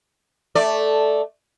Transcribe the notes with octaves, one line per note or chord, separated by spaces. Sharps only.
A3 D5